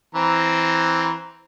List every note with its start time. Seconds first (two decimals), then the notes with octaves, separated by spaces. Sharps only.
0.15 E3 C4 A#5